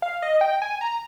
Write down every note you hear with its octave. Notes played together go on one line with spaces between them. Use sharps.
F5
D#5
G5
G#5
A#5